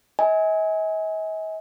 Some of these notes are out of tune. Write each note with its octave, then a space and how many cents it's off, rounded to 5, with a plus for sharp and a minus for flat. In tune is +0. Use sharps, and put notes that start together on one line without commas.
D#5 +45 G#5 +0